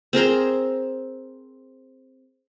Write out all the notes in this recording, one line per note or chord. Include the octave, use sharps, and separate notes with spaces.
C4 G#4 A#4 C5